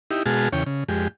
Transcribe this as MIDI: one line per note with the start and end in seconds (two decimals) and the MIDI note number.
0.11 0.23 63
0.11 0.23 64
0.11 0.23 67
0.26 0.48 47
0.26 0.48 56
0.26 0.48 66
0.26 0.48 68
0.26 0.48 81
0.26 0.48 89
0.53 0.64 40
0.53 0.64 49
0.53 0.64 73
0.53 0.64 79
0.66 0.84 49
0.89 1.08 41
0.89 1.08 56
0.89 1.08 67